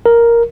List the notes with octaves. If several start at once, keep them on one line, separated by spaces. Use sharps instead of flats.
A#4